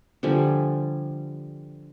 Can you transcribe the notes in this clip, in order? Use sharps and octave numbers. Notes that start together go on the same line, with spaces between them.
D3 F3 G3 G#5